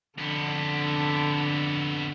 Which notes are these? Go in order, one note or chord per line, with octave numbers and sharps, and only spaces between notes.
F2 D3 B3